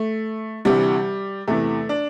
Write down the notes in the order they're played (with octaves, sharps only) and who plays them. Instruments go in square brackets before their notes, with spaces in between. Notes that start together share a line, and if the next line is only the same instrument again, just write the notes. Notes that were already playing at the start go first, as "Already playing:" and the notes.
Already playing: [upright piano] A3
D2 C3 E3 G3
E2 C3 E3 A3
D4